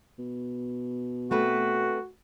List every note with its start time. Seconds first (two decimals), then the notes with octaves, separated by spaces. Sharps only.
0.19 B2
1.31 A3 C4 F#4 B4